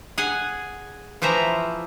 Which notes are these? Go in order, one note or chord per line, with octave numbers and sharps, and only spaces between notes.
G#4 F#5 G#5
E3 F3 C5 E5 A#5